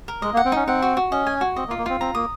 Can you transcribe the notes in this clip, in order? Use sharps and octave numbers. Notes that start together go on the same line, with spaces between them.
A#4
G#3 D#5
A#3
F#5
C4
C#4 D#4
C4 F#5
F#4
F#4
C#4 D#5
G#5
F#4
C4 D#5
A#3
F4
A#3
C4 F4
C4 A#5
A#3 D#6